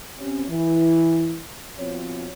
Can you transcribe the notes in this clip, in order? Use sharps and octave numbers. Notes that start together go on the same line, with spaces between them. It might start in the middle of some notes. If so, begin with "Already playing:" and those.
C3 C#4
E3
B2 F3 C4 C#5